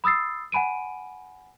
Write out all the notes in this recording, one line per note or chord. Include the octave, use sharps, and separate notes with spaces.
B5 D#6 E6 A6 C7
F#5 G#5 B5 D7 D#7